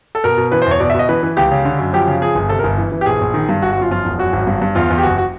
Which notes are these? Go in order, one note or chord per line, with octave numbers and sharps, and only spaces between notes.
A4
B2 A#4
B2
E3 B4
C5
E2 C#5
B2 D5
E5
B2 D#5
E3 B4
E3
C#2 G4
C#3
D3
F#2
F3 G4
C#3
F3 G#4
G1
C3 A4
A#4
G1
E3
E3
G4
A#1 G#4
A#1
D#3
G2
G1 F#4
F#4
F#2 F4
F3 F4
E1
F#2 F#4
G#1
G2
G2
E2 F4
E2
G4
F#1 F#4
F#4